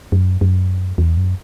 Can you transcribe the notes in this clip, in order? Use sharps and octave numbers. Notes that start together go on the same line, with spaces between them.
F#2
F#2
E2
F#2